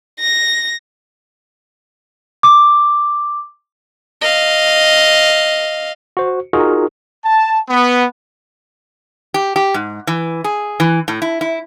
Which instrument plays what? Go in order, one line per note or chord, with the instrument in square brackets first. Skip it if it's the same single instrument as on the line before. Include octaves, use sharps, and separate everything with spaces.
[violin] A#6
[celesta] D6
[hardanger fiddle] D#5 F5
[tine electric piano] F#4 C5
D#4 F4 F#4 G#4 A#4
[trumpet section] A5
B3
[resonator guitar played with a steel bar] G4
G4
G#2
E3
G#4
E3
A2
E4
E4